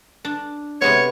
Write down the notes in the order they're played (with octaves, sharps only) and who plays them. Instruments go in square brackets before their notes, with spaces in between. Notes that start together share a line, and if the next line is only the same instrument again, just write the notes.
[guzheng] D4
[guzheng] C3 G#3 B3 [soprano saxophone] C#5